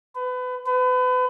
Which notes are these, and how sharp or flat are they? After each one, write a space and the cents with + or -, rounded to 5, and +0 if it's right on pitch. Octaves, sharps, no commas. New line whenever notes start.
B4 +30
B4 +35